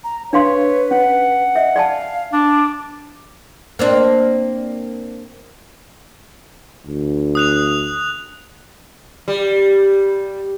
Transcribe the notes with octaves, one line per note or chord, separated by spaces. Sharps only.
A#5
D4 B4 C#5 F5 C6
C#4 F#5
D#5 E5
D5 F5 G#5 A5
D4 D6
A#3 C4 D4
D2
D#6 F#6 F7
G3